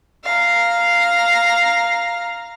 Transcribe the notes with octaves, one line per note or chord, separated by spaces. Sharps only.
F5 A#5